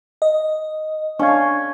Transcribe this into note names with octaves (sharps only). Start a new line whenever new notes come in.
D#5
C#4 D4 F5 C#6 G#6